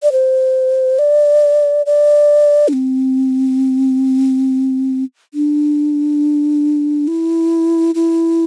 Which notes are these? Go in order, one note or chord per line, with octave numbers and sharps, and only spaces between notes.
D5
C5
D5
D5
D4
C4
D4
E4
E4